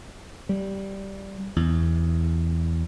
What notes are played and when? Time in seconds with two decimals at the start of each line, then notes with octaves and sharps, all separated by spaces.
0.49 G3
1.56 E2